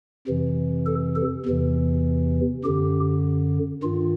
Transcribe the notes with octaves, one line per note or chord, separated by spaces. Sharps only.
F2 C3 E3
A4
A4
E2 C3 E3
F#2 D3 G4
G2 D#3 F4